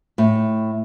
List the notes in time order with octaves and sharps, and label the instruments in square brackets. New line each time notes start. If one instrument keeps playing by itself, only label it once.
[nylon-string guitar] A2